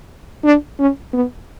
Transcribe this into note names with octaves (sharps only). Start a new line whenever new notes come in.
D4
C#4
B3